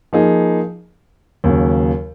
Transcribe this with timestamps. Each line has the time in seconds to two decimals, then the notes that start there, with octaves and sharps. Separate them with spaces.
0.13 F3 A#3 D#4 G#4
1.44 D#2 C#3 F#3